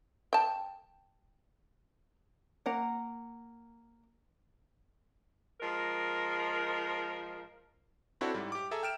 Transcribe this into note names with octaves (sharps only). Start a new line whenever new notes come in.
G5 A5
A#3 F#5 A#5
F3 G#3 A#4
C4 D4 E4 F#4 A4 C#5
G#2 G3 E4
G4 D6
G#4 A4 E5 A#5
G5 F6 D7 E7